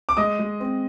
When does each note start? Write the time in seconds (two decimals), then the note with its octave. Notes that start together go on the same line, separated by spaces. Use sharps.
0.09 D6
0.17 G#3 D#5 D#6
0.39 G#3
0.60 C4